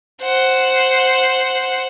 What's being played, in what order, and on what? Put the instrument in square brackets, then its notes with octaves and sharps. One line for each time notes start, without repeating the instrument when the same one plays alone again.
[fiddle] C5 F#5